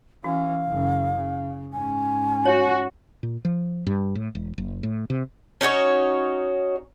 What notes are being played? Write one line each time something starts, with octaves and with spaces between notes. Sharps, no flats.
E3 C#4 F#4 F5
F#1 C#3
C#3
G#2 C#4 G#5
F#4 C#5
A#2
F3
G2
A2
E1
F#1
A2
C3
C#4 D#4 F#4 C#5